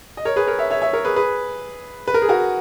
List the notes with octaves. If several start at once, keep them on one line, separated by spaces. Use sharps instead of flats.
D#5
A#4 C#5
G#4 B4
A#4 C#5
C#5 E5
C#5 E5
C#5 E5
A#4 C#5
G#4 B4
G#4 B4
B4
A#4
G#4
F#4 A#4